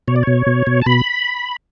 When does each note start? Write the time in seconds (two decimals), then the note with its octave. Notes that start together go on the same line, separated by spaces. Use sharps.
0.08 B2 C#5
0.16 D5
0.23 B2 C#5
0.47 B2
0.67 B2
0.82 A5
0.86 B2 B5